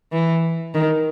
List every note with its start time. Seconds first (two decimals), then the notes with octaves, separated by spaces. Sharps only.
0.12 E3
0.74 D#3